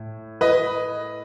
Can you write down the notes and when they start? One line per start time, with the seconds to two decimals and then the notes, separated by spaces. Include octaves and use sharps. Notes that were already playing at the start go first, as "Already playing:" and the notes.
Already playing: A2
0.41 B4 D#5